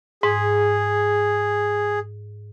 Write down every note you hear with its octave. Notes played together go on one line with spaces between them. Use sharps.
G#2 G#4